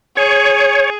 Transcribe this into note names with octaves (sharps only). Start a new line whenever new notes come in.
G#4 C#5